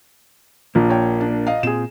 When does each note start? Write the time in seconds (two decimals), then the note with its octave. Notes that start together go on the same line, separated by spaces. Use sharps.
0.75 A#1 A#3
0.89 C#5 G5
1.21 D4
1.47 D#5 F5
1.63 A#2 C4 F4 G#4 E7